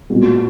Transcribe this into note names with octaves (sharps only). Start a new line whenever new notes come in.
A#2 G#3 B3 F#4